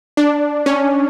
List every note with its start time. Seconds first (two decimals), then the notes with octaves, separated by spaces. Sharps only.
0.17 D4
0.66 C#4